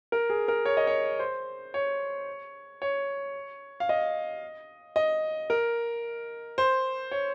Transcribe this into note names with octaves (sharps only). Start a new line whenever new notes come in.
A#4
G#4
A#4
C#5
D#5
C#5
C5
C#5
C#5
F5
D#5
D#5
A#4
C5
C#5